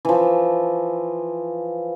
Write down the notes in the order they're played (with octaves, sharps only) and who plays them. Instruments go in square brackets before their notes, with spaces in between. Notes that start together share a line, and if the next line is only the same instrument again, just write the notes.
[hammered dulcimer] E3 F3